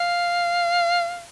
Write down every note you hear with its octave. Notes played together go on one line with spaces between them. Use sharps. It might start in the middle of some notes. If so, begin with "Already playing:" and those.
Already playing: F5